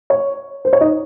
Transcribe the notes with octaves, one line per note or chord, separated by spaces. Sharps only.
C#5
C5
C#5
D#4 D#5